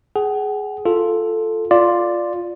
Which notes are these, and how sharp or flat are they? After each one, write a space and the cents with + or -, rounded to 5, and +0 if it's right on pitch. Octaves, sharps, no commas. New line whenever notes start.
G#4 +10 F#5 +35
F4 +0 A4 +0
F4 +0 D5 +0